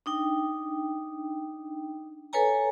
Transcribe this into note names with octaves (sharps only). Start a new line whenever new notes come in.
D4 D#4 G5
A4 B4 C#5 G#5 A#5